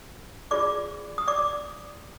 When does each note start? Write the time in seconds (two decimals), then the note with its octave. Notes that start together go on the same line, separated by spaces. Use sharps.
0.51 F4 G#4 C5 D5 D6
1.18 D#6
1.28 D5 D6